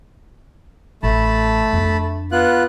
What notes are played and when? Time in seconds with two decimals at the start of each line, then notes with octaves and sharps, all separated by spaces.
1.03 A1 A3 A5 B5
1.73 F2 D4
2.32 B3 F4 F#6